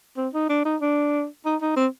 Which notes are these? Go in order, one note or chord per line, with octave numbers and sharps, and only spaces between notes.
C4
D#4
D4
D#4
D4
D#4
D#4
C4